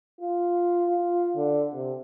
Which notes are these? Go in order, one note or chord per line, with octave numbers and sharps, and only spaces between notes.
F4
F4
D3
C3